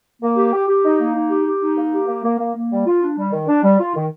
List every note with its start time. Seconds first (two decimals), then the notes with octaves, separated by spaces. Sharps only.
0.22 A#3
0.36 G4
0.53 G4
0.68 G4
0.84 D#4
1.00 A#3
1.15 D#4
1.30 G4
1.46 G4
1.62 D#4
1.77 A#3
1.92 G4
2.07 A#3
2.24 A#3
2.39 A#3
2.55 A#3
2.71 G3
2.86 F4
3.02 D4
3.17 G3
3.32 D#3
3.47 D4
3.63 G3
3.79 F4
3.95 D#3